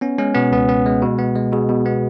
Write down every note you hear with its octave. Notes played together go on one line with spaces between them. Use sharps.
B3 C#4
G#3 C#4
B2 B3
C#2 B3
B3
G#3
B2
B3
G#3
B2 G#4
B2
B3